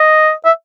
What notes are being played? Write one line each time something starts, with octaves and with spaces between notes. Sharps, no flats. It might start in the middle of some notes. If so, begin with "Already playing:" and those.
Already playing: D#5
E5